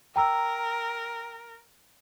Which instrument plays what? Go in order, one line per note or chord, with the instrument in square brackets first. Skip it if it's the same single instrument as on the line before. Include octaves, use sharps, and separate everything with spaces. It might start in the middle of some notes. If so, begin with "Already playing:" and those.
[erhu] A#4 [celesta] G5 A#5 E6